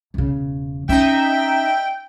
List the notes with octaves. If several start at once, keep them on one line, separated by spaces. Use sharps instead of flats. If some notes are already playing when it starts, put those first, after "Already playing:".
E1 C#3
C#4 D#4 E5 G5